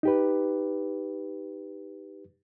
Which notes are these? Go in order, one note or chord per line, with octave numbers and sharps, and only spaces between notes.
D#4 G4 B4